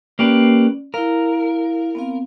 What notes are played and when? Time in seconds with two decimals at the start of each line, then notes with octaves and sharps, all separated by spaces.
0.19 A#3 C#4 G4 B4 D5
0.94 E4 A#4 F5
1.95 B3 C4 F5